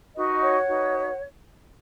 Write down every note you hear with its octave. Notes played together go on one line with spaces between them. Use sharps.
D#4 F#4 B4 D#5
C#5 F#5
D#4 F#4 B4